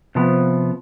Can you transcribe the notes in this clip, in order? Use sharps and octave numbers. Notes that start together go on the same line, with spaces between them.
C3 F3 B3